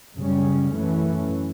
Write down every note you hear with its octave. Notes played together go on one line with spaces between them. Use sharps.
F#2 C#3 G3 C#4
F#2 E3 A3 C#4